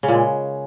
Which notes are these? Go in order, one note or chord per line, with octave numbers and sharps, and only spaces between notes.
C#3
A#2
G#3